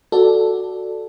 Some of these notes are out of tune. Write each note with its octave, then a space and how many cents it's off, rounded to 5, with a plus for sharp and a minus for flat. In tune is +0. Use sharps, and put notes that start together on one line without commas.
F#4 +0 A4 +0 D5 +0